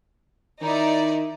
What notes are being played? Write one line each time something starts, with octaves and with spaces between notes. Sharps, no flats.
D#3 D#4 E4 D5